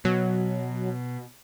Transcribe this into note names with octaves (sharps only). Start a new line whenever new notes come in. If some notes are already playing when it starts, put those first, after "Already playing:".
B2 F#3